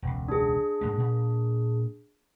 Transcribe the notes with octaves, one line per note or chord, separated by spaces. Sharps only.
E1 C#2
D4 G#4
G#2 G#3 A#3
A#2